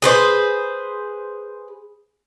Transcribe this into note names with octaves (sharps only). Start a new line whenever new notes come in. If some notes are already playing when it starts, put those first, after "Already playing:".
G#4 B4 C5